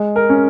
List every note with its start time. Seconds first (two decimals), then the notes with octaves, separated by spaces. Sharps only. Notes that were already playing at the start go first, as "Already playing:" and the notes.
Already playing: G#3
0.16 A#4
0.30 C#4